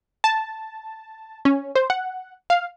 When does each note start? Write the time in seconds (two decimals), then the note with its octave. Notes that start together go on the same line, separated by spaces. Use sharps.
0.24 A5
1.45 C#4
1.75 C5
1.90 F#5
2.50 F5